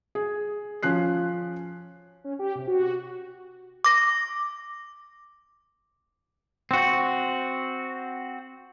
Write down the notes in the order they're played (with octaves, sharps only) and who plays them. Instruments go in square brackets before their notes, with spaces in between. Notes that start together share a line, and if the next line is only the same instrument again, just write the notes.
[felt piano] G#4
F3 C#4 F#6 C7
[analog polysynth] C#4
G4
C3
F#4
[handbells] D6 A#6
[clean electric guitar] C4 F#4